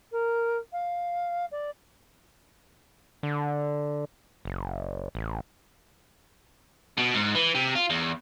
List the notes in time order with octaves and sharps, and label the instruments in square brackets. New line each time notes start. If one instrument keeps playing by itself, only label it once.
[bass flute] A#4
F5
D5
[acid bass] D3
F#1
A1
[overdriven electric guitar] B2
G#2
E3
C3
F4
E2